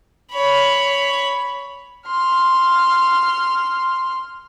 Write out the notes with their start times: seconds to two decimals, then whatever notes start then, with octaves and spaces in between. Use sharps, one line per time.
0.32 C#5 B5
2.07 C6 F6